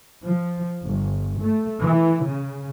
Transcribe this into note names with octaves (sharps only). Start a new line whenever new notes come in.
F3
G1
A3
E3
C#3